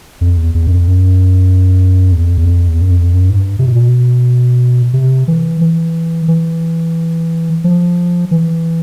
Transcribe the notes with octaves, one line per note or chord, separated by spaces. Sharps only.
F2
E2
E2
F#2
F2
F#2
E2
F2
E2
F2
E2
F#2
F2
F#2
G#2
G2
C3
B2
A#2
B2
C3
E3
E3
E3
F3
E3